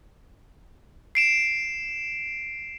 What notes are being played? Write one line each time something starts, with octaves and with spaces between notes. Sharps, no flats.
C7 D7 E7